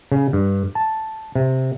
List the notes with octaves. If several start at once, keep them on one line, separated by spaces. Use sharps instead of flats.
C#3
G2
A5
C3